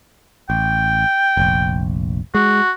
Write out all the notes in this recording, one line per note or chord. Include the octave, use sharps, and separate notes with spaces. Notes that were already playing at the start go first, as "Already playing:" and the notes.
A1 G5
F1 A#1
G#3 F#4